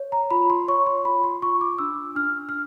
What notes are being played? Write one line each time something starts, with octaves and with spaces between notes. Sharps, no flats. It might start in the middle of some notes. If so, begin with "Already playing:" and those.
Already playing: C#5
A#5
F4 B5
C6
C#5 C#6
C6
F4 B5
C6
F4 C#6
D6
D4 E6
D4 F6
F6